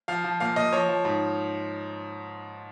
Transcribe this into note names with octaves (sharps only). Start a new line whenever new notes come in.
F3 F5
F3
A#2 F5
A#2 D#5
F3 C#5
F3
G#2